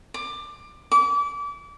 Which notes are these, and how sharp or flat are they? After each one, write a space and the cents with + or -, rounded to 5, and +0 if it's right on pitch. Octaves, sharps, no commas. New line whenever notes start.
D6 +20
D6 -30